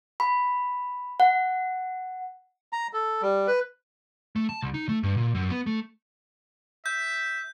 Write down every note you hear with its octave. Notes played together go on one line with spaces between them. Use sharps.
B5
F#5
A#5
A4
G3
B4
A3
A5
C2
D#4
A3
G2
A#2
F#2
B3
A3
E5 G6